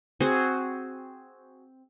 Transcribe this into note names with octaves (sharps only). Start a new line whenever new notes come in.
C4 F#4 G#4